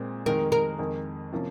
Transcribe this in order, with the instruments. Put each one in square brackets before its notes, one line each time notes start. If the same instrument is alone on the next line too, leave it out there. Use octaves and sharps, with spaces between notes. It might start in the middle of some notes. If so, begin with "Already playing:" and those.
Already playing: [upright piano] A#2 G#3 C4
[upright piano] F2 D#3 G#3 D#4 [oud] A#4
[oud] A#4
[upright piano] F2 D#3 G#3
C3 F3 A#3 C#4